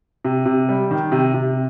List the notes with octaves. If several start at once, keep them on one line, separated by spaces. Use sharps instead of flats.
C3
C3
G3
D#3
C3
C3